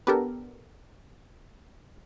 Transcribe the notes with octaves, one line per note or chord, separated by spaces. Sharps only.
B3 D4 G4 A4 A#4